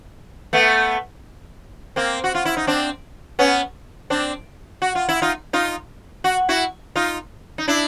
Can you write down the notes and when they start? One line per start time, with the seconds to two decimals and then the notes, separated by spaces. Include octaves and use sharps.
0.53 A3 B3
1.96 A#3 C4
2.24 F#4
2.35 F4
2.45 E4
2.57 D#4
2.67 C4 D4
3.39 B3 C#4
4.10 C4 D4
4.82 F#4
4.95 F4
5.09 E4
5.22 D#4 F4
5.53 D#4 F4
6.24 F#4
6.49 E4 F#4
6.96 D#4 F4
7.58 D#4
7.68 D4 E4